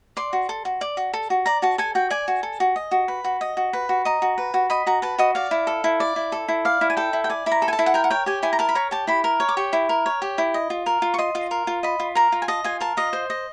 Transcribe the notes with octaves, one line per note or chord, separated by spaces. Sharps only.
D5 C6
F#4
A4
F#4
D5
F#4
A4
F#4
D5 A#5
F#4 A5
A4 G#5
F#4 G5
D5 G#5
F#4
A4
F#4
D#5
F#4
B4
F#4
D#5
F#4
B4
F#4
D#5 A#5
F#4
B4
F#4
D#5 B5
F#4 A#5
B4 A5
F#4 D#5
D5 F5
E4
A4
E4
D5
E4
A4
E4
D5 F5
E4
G#5
A4 G5
E4
G5
D5 G#5
E4 B5
A#5
A4
G#5
A5
E4
F#5
A#4 G5
F#5
C#5 G5
G4 G#5
E4 G#5
A#5
A#4 A5
B5
C#5 A#5
G4 A5
E4 B5
A#4
C#5
D6
G4 C#6
E4
A#4
C#5
G4
E4
D#5
F4
A#4
F4
C#6
D#5 C6
F4
A#4
F4
D#5 B5
F4
A#4 A#5
F4
G#5
D#5 A5
F4 G#5
A#4 A5
F4 D#5
C5
D#5